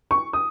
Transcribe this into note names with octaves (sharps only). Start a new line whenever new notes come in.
C#6
D#6